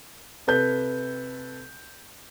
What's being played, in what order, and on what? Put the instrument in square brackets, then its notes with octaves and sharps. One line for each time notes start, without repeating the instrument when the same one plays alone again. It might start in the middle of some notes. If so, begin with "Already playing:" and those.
[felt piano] C3 A4 B4 G6